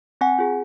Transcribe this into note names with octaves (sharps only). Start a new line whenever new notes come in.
C4 F#5 G#5
F4 G#4